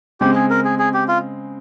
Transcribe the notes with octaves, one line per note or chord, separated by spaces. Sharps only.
C#3 G#3 C4 G4
G#4
A#4
G#4
G#4
G4
F4